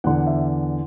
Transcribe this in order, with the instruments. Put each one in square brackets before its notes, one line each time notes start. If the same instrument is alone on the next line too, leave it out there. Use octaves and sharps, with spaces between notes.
[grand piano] E2 D3 F#5
E5